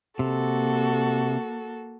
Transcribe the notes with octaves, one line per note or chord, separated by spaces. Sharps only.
C3 A#3 F#4 A4